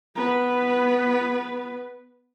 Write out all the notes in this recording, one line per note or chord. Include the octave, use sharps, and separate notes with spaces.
B3 B4